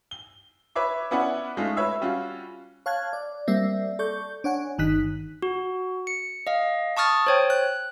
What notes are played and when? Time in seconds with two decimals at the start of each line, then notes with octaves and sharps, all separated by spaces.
0.11 G7
0.75 B4 C#5 E5 D6
1.11 B3 C#4 E4 D5 F#5 G#5
1.57 G#3 A3 C#4 D#4 F4
1.77 B4 C#5 E5 E6
2.01 G3 C#4 F4 F#4
2.86 C#5 F5 A5 F#6 G#6
3.13 D5
3.48 G3 A#3 C4 D5 E5
3.99 A4 D5 C#6 G6
4.44 D4 C#5 F#5 G#5
4.78 G1 D#3 D#4 F#6 B6
5.42 F#4
6.07 C#7
6.47 D#5 F5
6.97 A5 C#6 D#6 F6 A6
7.27 C5 C#5 G5
7.50 F#6